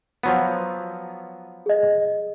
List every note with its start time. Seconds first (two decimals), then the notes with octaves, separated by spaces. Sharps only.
0.23 F3 F#3 B3
1.66 G#4 D#5